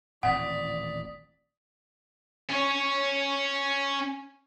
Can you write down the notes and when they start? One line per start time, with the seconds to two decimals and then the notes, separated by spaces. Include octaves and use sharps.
0.23 D#1 A1 C4 D5 F#5 D#6 B6
2.50 C#4 C#5